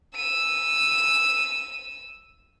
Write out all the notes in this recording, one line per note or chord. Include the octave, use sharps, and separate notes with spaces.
E6 D#7